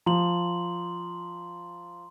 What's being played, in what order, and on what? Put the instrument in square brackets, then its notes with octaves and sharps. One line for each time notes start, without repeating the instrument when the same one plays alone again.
[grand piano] F3 [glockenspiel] A#5 C6 F#7